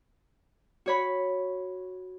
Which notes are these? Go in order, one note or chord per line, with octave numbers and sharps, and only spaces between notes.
F#4 C#5 B5